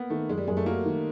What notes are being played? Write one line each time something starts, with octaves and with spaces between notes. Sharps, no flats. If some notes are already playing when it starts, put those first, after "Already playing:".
Already playing: A#3 B3
D#3 A3
F#2 G#3
G3
F#2 G#3
A3
F#3 A#3
D#3